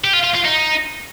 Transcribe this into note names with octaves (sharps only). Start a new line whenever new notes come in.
G4
F4
F4
F4
D#4